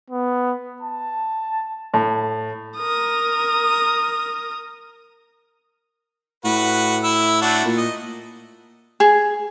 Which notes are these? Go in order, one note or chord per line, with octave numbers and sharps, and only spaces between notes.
B3
A5
A2
A#4 D#6
A2 F#4 B4
E4 E6
A3 D4 F#4
A#2
D#5
G#4